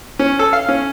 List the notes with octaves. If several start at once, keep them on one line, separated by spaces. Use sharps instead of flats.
C#4
A4
F5
C#4